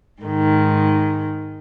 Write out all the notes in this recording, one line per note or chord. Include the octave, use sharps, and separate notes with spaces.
G#2 D#3